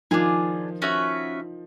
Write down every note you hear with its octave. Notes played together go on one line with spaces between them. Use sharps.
D#3 F3 D4 F4 G#4
C#4 F#4 B4 E5